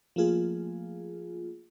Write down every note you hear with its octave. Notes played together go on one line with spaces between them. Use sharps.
F3 A3 A#3 F4 G#4